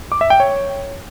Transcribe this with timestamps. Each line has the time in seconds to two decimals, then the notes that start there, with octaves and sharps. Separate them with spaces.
0.12 D6
0.21 E5
0.30 G5
0.40 C#5